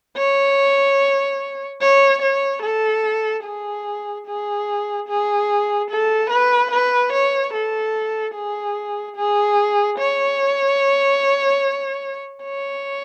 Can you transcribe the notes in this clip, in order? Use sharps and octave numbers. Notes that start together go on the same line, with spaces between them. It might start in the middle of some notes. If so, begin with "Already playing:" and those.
C#5
C#5
C#5
A4
G#4
G#4
G#4
A4
B4
B4
C#5
A4
G#4
G#4
C#5
C#5